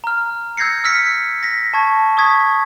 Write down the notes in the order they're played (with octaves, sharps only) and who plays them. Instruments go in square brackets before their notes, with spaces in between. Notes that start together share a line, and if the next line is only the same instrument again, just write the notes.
[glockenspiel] A#5 F6
E6 G6 G#6 A#6 C7 C#7
E6 F6 B6 C#7
A#6 B6
A5 C#6 G#6
C#6 D#6 G#6 B6